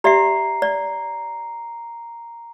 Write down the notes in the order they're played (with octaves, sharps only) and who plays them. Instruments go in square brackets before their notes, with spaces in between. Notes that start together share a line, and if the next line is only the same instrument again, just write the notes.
[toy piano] G4 D5 E5 [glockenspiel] A#5 C7
[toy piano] D5